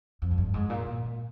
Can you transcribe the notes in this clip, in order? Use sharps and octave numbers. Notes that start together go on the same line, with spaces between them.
F2
G#2
G2
G#2
A#2
A#2